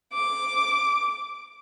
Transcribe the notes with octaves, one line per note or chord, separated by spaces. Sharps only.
D6